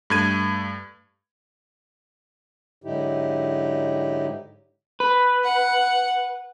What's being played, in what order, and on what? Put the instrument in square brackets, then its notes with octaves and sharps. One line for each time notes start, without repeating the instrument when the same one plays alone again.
[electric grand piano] G2 A3 G#6 D#7
[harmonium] G#2 D3 F#3 D#4 E4 G4
[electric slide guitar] B4
[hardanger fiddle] F#5